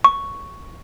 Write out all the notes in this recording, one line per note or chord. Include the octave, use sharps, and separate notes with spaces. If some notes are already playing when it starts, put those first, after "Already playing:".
C#6